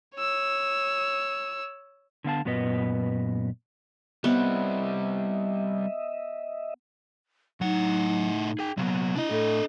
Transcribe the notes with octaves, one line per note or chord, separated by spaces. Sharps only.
C#5 E6
D3 B3 F5 A5
F#2 A#2 B3 B4 D#5
G3 B3 C4 D#5 E5
A2 F#3 D#4 F#5
G#4 G5
C3 F#3 A#3 B3
D4 E4 D#5
A2 A4